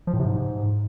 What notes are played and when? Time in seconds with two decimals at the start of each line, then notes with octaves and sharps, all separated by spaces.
0.07 F3
0.13 A2
0.19 C3
0.25 G#2